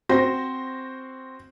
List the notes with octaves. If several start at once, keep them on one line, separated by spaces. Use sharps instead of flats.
C4 F#4 C5 A#6